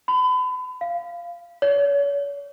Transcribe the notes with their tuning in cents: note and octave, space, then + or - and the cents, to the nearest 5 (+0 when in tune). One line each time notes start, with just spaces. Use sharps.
B5 +35
F5 -15
C#5 +40